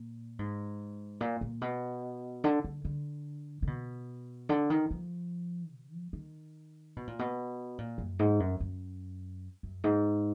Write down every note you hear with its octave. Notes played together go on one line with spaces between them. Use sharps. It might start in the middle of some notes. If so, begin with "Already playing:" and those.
Already playing: A#2
G#2
A#2
A#2
B2
D3
D3
D3
D3
B2
D3
D#3
F3
B2
F3
D#3
B2
A#2
B2
A#2
F#2
G#2
F#2
F#2
F#2
G#2